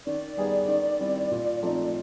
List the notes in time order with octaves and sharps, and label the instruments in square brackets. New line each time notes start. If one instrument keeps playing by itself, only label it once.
[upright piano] D#3 [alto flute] D5
[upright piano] G3 B3 D#4 G#4
D#3
G3 C4 E4
A#2
F3 A3 C4 D#4